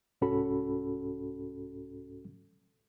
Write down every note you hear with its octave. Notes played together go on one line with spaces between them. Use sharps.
C2 G#2 C#4 F#4 A4 B5